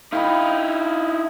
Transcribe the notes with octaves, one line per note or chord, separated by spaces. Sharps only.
D#4 E4 F5 G5 B5